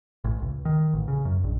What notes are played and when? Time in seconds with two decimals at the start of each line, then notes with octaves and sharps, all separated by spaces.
0.24 A1
0.42 C#2
0.65 D#3
0.93 A1
1.08 C#3
1.25 F#2
1.44 A#1